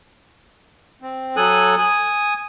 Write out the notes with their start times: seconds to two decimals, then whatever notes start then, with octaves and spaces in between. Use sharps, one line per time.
1.02 C4
1.37 F#3 A4 G#5 D#6 F#6
1.78 G#5 D#6